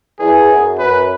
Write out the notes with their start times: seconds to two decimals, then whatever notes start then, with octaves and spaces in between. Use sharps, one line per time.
0.19 E2 G#4
0.49 F#2
0.79 F#2 B4